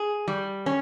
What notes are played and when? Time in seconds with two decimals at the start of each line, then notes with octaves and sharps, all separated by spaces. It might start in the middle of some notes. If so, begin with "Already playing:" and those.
Already playing: G#4
0.28 G3
0.66 C#4